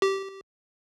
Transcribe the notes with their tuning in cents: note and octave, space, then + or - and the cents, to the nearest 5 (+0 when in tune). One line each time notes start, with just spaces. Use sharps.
G4 -15